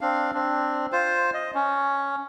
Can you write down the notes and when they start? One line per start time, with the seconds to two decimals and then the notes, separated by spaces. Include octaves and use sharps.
0.01 C4 D4 F5
0.34 C4 D4
0.92 F4 C5
1.34 D#5
1.55 C#4